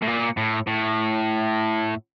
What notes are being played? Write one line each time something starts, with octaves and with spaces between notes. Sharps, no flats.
A2
A#2
A2
A2